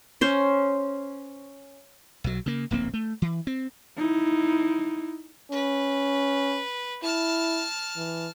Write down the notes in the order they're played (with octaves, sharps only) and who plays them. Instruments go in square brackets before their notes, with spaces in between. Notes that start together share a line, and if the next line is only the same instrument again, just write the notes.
[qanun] C#4 C5
[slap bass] B1 F#3
C#3 A#3
D1 A#1 A#3 C4
A3
E3
C4
[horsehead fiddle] D#4 E4
[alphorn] C#4 [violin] B4
[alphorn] E4 [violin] A5 F6
[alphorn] E3